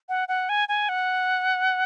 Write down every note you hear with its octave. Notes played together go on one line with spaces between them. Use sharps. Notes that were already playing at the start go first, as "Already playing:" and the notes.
F#5
F#5
G#5
G#5
F#5